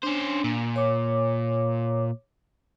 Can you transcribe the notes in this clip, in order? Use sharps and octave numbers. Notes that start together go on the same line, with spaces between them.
C#4 D4 C5
A#2
C#5 D6